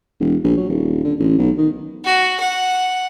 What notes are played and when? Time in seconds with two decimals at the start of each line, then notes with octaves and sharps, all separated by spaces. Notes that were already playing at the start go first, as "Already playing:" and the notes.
0.20 E1
0.44 A#1
0.57 F#3
0.69 D#1
1.04 D3
1.20 A1
1.38 B1
1.58 D#3
2.05 F#4
2.40 F#5